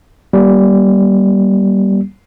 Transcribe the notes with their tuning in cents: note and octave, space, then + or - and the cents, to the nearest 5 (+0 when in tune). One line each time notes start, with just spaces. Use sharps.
G3 -15 A#3 +30